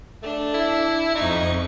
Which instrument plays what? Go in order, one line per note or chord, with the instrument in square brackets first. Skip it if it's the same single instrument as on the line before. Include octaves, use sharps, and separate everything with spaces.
[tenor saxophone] A3 [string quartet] D4
[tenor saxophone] E4
[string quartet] F2 C#6 [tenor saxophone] D#4